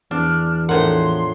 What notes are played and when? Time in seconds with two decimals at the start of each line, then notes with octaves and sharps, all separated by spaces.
0.11 E2 D4 F6
0.69 A2 F3 D4 A#4 F#5 C6